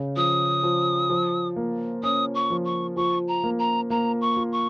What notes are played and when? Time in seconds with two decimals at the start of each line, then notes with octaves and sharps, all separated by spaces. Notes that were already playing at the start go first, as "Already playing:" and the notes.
Already playing: C#3
0.16 F3 D#6
0.63 F3
1.10 F3
1.56 A#3
2.03 C#4 D#6
2.35 C#6
2.50 F3
2.65 C#6
2.96 F3 C#6
3.28 A#5
3.44 A#3
3.59 A#5
3.90 A#3 A#5
4.21 C#6
4.37 F4
4.53 C#6